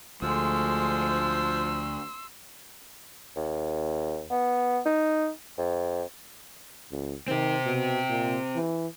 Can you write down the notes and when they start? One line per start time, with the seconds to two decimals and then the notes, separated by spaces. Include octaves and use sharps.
0.22 D2 F3 G#3 C6 E6
3.36 D#2
4.31 B3
4.86 D#4
5.58 F2
6.92 C#2
7.28 D#3 C4 G4
7.66 B2
8.09 A#2
8.56 E3